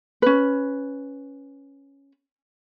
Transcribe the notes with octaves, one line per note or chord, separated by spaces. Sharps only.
C#4 B4